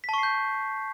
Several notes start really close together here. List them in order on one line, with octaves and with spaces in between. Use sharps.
B6 A5 C#6 C7 G6